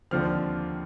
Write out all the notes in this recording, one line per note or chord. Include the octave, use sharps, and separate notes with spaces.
D#2 D3 F3 C4 F6